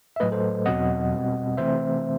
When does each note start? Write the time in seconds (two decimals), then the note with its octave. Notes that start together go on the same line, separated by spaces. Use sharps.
0.16 E5
0.20 A2 F#3 A3 B4 D#5
0.32 A4 C5
0.66 E2 B2 F#3 C4 D#5 F#5
1.12 B2 G3 C4
1.57 C3 E3 A3 C4 C5 E5